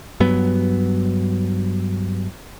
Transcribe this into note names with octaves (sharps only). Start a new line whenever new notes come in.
G2 F#3 B3